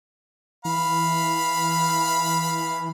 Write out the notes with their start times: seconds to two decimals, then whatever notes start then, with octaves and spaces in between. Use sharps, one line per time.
0.65 E3 F5 B5